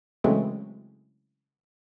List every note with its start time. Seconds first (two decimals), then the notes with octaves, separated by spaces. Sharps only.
0.24 C#3 E3 F#3 G#3 A3 C4